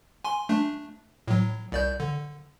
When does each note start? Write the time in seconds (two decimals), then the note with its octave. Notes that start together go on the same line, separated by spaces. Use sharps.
0.24 G#5 C6
0.49 A3 D4
1.28 A2 F#3
1.72 C2 D5 G6
2.00 D3